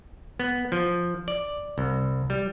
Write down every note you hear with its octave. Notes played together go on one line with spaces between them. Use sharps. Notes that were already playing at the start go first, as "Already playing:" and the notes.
B3
F3
D5
C2
G3